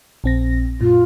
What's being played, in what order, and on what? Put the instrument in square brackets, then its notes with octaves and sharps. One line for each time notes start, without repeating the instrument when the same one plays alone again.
[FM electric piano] A#1 C4 A#6
[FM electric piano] F#2 A#2 [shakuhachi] F4